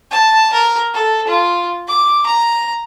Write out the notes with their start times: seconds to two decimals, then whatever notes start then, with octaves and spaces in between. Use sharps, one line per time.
0.11 A5
0.53 A#4
0.94 A4
1.27 F4
1.88 D6
2.26 A#5